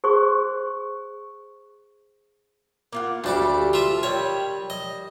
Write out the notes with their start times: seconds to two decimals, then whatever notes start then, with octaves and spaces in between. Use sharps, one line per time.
0.04 G#4 C5 C6 C#6
2.93 A#3 F4 F#5
3.24 D2 G3 A4 D5 D6
3.73 F4 E5
4.03 D#3 G3 C#5
4.70 D#5